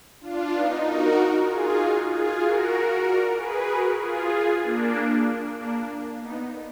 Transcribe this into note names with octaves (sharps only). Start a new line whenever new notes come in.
D4 F4
B3 D#4
F#4 A#4
F4 G#4
D#4 F#4
F4 G#4
F#4 A#4
A#4 D5
G#4 B4
F#4 A#4
F4 G#4
F4 G#4
A#3 D4
A#3 D4
B3 D#4